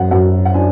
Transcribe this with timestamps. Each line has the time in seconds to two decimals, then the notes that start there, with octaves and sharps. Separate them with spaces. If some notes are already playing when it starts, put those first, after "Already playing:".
Already playing: F#2 F#5
0.11 F#2 F#5
0.45 F#5
0.54 D4 G#5